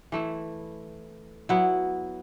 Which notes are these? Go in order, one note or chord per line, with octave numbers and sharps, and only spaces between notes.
E3 A3 E4
F#3 B3 E4